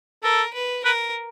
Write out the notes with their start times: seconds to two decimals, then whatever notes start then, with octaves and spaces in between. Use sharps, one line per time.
0.23 A4 A#4
0.54 B4
0.84 A#4 B4